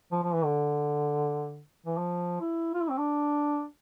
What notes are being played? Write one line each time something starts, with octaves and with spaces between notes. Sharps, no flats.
F3
F3
E3
D3
E3
F3
E4
F4
E4
C4
D4